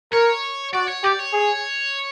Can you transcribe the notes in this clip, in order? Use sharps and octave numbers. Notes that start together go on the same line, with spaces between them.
A#4 C#5
F#4 D5
C#5
G4 D5
C#5
G#4